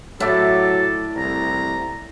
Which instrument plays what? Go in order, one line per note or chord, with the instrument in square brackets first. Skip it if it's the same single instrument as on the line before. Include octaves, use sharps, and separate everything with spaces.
[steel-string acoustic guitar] A2 [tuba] F#3 [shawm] A4 [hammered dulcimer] D5 E5
[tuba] C2 [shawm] A#5